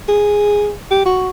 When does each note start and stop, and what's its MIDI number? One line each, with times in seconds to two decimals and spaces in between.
0.09 0.72 68
0.91 1.05 67
1.06 1.30 66